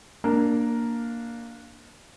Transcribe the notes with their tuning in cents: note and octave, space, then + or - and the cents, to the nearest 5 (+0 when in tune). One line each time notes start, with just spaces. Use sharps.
A#3 +0 D4 +0 A#4 +0